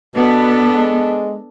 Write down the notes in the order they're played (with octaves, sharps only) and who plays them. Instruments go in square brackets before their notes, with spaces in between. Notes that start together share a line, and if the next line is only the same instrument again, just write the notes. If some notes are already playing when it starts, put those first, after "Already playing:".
[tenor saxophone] B2 [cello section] B3 [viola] D4 A4
[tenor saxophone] G#3